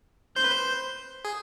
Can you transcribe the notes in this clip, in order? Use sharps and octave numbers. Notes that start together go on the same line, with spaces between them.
C5 G6
B4
C5
G#4